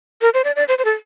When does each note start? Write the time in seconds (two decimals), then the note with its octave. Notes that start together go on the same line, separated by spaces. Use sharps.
0.22 A#4
0.34 C5
0.44 D5
0.56 D5
0.68 C5
0.78 C5
0.85 A4